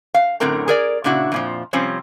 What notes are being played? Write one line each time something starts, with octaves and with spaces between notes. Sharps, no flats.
F5
F#2 A2 D3 C4 A#4 A#5
G#4 A#4 D5
A#2 C#3 D4 E4 F#4
F2 A#2 F3
C3 F3 G3 C4 C#4